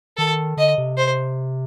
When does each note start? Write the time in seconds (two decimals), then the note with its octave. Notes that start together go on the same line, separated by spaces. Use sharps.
0.17 D#3 A4
0.57 D3 D#5
0.78 C3
0.97 C5